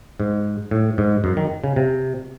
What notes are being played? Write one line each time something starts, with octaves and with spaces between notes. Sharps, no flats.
G#2
A2
G#2
F#2
D#3
C#3
C3